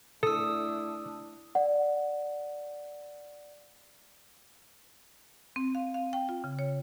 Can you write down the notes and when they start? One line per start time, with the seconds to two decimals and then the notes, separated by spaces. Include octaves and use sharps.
0.23 A3 D4 E4 A4 D#6 E6
1.55 D5 F#5
5.56 C4
5.75 F5
5.94 F5
6.13 G5
6.29 F4
6.44 C#3
6.59 C#5